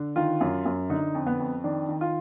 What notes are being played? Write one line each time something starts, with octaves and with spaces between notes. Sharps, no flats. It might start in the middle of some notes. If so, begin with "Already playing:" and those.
Already playing: D3
D#3 F4
F#2
F#2
D3 D#4
F2
B3
F2
D#3 D4
D#3
F4